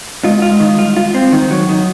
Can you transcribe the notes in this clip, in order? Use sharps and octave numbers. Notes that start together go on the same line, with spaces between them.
G#3 F4
F4
G#3
D#3
G3 F4
F4
C4
D#3
F#3
D#3